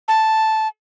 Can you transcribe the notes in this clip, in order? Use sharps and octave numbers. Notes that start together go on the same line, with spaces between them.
A5